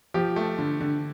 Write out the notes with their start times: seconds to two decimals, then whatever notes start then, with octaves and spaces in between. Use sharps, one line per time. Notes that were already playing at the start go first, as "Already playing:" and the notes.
0.14 F3 G4
0.36 A3
0.58 D3
0.81 D3